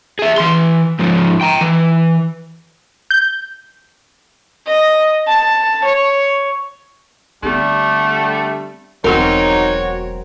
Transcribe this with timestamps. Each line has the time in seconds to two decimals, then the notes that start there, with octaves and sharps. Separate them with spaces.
0.19 G#4 E5
0.38 E3 C6
0.99 G#2 F3
1.41 G5 A#5
1.61 E3
3.10 G6
4.67 D#5
5.27 A5
5.85 C#5
7.43 D3 G3 A3 B3 C4
9.04 E1 E3 F#3 C4 D#4 F#4 A#4 C#5